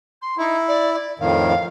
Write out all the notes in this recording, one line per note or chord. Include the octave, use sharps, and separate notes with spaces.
C6
D#4 E4
D5
D5
F2 A2 D#3 F5